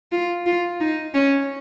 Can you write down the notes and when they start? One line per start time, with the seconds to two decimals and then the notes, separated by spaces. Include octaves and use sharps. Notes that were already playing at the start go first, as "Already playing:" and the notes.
0.12 F4
0.46 F4
0.81 D#4
1.14 C#4